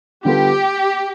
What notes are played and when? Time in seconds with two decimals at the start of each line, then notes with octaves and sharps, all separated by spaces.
0.24 D3 G3 B3 F4 G4 A4